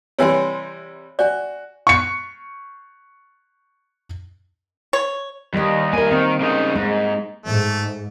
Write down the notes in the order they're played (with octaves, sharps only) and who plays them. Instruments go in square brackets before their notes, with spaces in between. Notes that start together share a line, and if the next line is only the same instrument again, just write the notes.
[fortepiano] C3 E3 G3 [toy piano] C#5 G#5 C6
[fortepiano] F#4 [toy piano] D5 G#5
[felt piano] C#6 C#7
[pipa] C#5
[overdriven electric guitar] D#2 [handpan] G3 D#5
[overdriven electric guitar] D#3 G#5 [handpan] A#3 A#4
[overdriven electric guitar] D#3 [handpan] C4
[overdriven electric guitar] C#3 D#4
[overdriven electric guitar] G#2 [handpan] G#3
[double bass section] G#2 [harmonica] A3